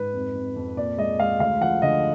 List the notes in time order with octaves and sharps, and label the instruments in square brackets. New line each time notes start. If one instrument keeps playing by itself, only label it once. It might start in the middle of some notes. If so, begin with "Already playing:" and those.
Already playing: [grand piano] G#2 B4
F2
F2
F2
A#2 D5
G#3 D#5
G#3 F5
D2 F5
F3 F#5
D3 D#5